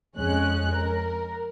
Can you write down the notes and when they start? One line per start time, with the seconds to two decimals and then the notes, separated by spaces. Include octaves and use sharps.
0.15 F2 G#3 C#4 F#6
0.73 A#4